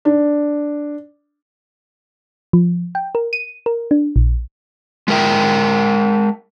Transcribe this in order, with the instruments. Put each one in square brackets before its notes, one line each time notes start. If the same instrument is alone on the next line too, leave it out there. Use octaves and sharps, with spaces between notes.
[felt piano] D4
[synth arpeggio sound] F3
G5
A#4
D#7
A#4
D4
A#1
[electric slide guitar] G#3 A3 A#4 E5 G5